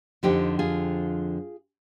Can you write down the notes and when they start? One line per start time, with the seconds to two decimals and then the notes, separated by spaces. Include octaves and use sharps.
0.23 F2 D3 F3 D#4 G4
0.59 F4 G#4